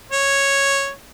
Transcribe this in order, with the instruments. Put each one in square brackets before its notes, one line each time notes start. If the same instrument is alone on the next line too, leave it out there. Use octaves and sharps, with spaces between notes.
[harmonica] C#5